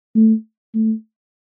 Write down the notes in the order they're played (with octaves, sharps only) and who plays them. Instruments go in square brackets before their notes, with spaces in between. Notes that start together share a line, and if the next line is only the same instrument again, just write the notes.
[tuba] A3
A3